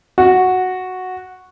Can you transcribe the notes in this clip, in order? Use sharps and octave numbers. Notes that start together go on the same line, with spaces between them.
F#4